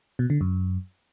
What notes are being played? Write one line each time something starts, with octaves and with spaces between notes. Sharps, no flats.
B2
D3
F#2